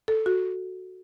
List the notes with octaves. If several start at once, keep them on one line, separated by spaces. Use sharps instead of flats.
A4
F#4